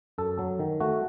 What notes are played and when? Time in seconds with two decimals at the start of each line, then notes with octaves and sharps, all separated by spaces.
0.18 F#2 A4
0.39 F#3
0.59 D#3
0.80 A3 F#4